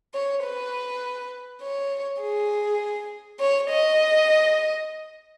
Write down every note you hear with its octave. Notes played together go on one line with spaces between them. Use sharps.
C#5
B4
C#5
G#4
C#5
D#5